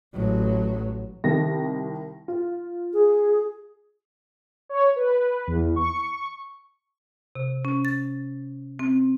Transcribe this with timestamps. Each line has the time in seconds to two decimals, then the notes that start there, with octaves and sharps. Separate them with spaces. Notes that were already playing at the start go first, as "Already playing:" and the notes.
0.14 A1 F#3
1.24 C2 D#3 A#6
2.28 F4
2.93 G#4
4.69 C#5
4.96 B4
5.47 E2
5.76 C#6
7.35 C3
7.65 C#4
7.85 A6
8.79 C4